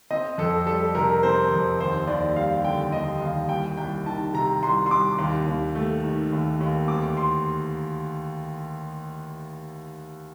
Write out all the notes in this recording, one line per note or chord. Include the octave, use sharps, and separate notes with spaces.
C4 D#5
F2 A4
G3 A4
C3 A#4
C4 C5
F2
D#2 C5
D#2 D5
G3 F5
D3 G5
D#2 D#5
D#2 F5
C2 G5
C2 G5
D#3 A5
C3 A#5
C2 C6
C6
C2 D6
D#2
D#2
A3
D#3
D#2
D#2
D2 D6
C6